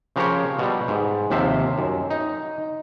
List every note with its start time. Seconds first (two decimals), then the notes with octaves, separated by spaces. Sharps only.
0.16 C#3 F3 G4 A#4 C5 C#5
0.59 B2 G3
0.88 G#2
1.30 D#2 C3 F3 C5 E5
1.78 F#2
2.10 D#4